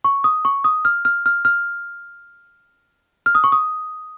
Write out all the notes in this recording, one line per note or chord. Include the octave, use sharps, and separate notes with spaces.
C#6
D#6
C#6
D#6
F6
F6
F6
F6
F6
D#6
C#6
D#6